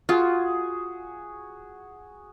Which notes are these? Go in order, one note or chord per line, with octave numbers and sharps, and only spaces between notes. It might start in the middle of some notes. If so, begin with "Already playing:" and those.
F4 F#4 G#4